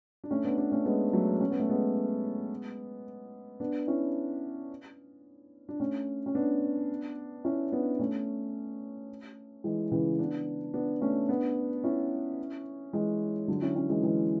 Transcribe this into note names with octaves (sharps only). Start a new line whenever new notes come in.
D4
A3 C#4
B3 D4
B3 D4
A3 C#4
G#3 B3
F#3 A3
C#4
B3
A3
G#3 B3
B3 D4
C#4 E4
D4
A3 C#4
C#4
B3 D4
C#4 E4
B3 D4
A3 C#4
E3 G#3
C#3 E3
B3 D4
B3 D4
A3 C#4
B3 D4
C#4 E4
E3 G#3
D3 F#3
C#4 E4
C#4 E4
E3 G#3
E3 G#3